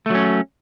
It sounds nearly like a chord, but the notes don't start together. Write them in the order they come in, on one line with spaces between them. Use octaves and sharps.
A3 F#3 C#4